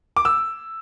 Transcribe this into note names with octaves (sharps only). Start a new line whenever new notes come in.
D6
E6